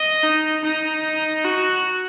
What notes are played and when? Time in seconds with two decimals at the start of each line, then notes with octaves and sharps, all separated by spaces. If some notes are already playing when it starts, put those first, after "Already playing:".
Already playing: D#5
0.23 D#4
0.64 D#4
1.44 F#4